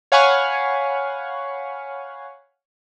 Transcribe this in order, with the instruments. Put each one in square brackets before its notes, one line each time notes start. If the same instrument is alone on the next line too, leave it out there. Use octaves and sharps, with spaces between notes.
[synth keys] C#5 F5 F#5 G#5 B5 C#6